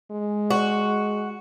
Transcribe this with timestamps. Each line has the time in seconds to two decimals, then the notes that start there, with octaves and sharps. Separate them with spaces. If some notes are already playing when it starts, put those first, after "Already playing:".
0.11 G#3
0.50 F#4